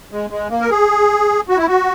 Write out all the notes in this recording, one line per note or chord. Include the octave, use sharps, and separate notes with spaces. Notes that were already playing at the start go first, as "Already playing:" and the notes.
G#3
G#3
A#3
A#4
G#4
F#4
E4
F#4